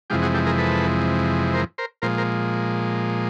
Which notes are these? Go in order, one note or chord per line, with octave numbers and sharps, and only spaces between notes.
F2 C3 E3 G#3 F4 G4
F#4 G#4
G4 A4
G#4 A#4
A4 B4
A#4 C5
A#4 C5
A#2 F3 G#3 A#4 C5
A#4 C5